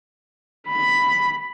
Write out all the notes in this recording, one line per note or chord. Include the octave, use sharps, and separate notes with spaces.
B5